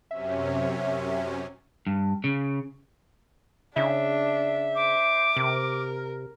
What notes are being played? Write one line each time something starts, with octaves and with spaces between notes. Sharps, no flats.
F#2 C3 C#4 E5
G2
C#3
C#3 D4 E5
C5 D6
C3 A#4